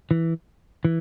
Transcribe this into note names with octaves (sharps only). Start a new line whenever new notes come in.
E3
E3